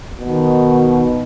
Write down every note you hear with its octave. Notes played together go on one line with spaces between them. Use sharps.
B2 D#3